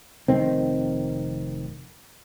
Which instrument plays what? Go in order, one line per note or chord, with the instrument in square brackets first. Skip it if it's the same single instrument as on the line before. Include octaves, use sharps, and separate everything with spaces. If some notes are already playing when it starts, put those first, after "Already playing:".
[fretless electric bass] F1 D#3 C4